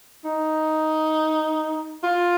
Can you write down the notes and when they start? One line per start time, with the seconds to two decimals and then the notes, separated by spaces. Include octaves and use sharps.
0.25 D#4
2.03 F4